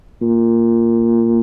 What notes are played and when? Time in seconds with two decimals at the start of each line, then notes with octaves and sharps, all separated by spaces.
0.22 A#2